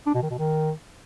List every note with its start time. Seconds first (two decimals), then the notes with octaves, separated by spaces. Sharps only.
0.06 D4
0.14 B2
0.22 D#3
0.30 B2
0.38 D#3